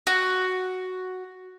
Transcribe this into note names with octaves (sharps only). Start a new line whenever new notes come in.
F#4